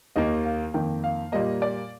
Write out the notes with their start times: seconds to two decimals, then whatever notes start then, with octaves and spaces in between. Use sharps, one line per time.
0.16 D#2 D#3 A#3 D#5
0.45 F5
0.74 F2 D#3 A#3 G5
1.04 F5
1.32 A#2 G3 A#3 D#5
1.62 D5